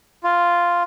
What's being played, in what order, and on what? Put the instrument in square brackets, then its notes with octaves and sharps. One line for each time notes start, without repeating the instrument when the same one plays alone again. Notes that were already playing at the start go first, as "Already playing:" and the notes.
[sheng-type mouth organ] F4